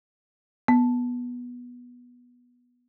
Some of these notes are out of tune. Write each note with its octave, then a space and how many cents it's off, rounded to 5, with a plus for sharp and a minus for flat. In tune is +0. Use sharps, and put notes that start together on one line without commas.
B3 -10